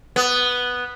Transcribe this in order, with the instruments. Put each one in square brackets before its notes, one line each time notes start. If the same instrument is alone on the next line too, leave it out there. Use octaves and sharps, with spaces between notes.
[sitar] B3